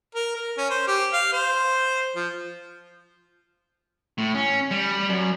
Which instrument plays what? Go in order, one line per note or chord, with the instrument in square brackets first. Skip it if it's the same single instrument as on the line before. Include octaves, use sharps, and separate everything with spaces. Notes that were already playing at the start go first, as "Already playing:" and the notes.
[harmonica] A#4
A#4
C#4
C5
G4
F5
C5
F3
[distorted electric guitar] A2
C#4
G3
F#2